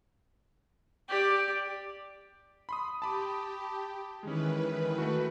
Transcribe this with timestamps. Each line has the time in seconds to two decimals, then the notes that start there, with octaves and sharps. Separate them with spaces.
1.09 G4 D5
2.69 B5 C6 D#6
3.02 G4 A5 B5 D6
4.23 D#3 E3 G#3 C#4 B4
4.98 A3 F#4